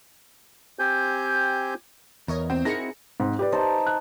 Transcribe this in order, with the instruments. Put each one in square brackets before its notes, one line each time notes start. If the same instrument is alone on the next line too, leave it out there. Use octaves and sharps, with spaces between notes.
[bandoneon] C4 G4 C5 G#5 G6
[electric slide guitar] E2 [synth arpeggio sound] A#4 C#5 D#5
[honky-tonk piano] C4
[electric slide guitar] C4 E4 F#4 [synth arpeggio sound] D#4 G#4 A#4 [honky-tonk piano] A#6 C#7
[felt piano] G#2 C4
G4 B4 D5
[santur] D#4 C5 A5
[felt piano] F#6